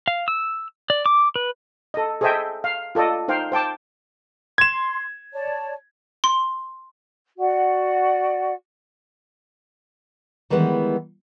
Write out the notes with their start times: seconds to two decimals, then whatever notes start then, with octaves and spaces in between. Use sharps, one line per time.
0.08 F5
0.28 E6
0.90 D5
1.06 D6
1.36 B4
1.94 A4 D#5
2.21 G#4 A4 C5 D#5 E5 G5
2.64 F5
2.95 F4 A4 D5 D#5
3.28 D#4 C5 F5 G5
3.52 C5 G5 A5 D6
4.58 C6 G#6 E7
5.33 C#5 D5 A5
6.24 C6
7.37 F#4 D5 F#5
10.50 D#3 E3 G3 G#3 B3